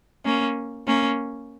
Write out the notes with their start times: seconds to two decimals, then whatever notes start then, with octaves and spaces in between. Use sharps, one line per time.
0.25 A#3 C#4
0.86 A#3 C#4